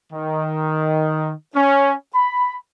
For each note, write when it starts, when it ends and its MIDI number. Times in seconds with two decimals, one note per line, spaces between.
0.13 1.32 51
1.56 1.94 61
2.15 2.56 83